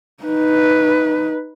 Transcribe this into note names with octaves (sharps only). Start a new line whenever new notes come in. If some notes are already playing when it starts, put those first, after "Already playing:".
D#4 B4